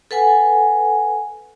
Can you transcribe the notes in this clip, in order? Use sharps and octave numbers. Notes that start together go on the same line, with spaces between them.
A4 B4 F#5 G#5